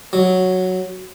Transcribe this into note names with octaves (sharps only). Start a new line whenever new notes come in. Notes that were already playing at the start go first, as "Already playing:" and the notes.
F#3